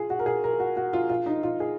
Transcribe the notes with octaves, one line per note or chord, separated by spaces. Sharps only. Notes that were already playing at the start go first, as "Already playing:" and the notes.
Already playing: F4 G#4
F#4
A#4
G#4
A#4
F#4
F#4
F4
F4
D#4
F4
G#4